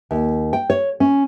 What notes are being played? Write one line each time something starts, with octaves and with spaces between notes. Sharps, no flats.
D#2
G5
C#5
C#4